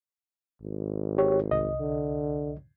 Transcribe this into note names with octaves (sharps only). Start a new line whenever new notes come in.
G#1
G4 C#5
C2 D#5
D3